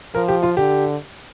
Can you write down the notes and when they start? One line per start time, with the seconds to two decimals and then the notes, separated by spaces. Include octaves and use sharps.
0.14 F3 A#4
0.28 G4
0.43 F4
0.57 D3 G4